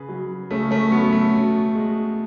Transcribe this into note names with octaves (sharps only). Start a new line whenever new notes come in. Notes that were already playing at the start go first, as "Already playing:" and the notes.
Already playing: C#3 G#4 B4
F#3
C#3 A3 C#4
A3 C#4
F#3 B3
A3
B2
G#3